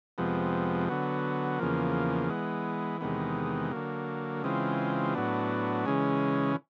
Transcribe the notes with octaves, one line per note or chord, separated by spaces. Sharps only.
F2 C3 F3 G#3 B3
D3 F#3 B3
E2 C#3 F3 A#3
E3 G#3 B3
E2 C3 D#3 G#3 B3
D3 F#3 A#3
C#3 E3 G#3 C4 F4
A2 F#3 B3 D4
C#3 E3 G#3 C#4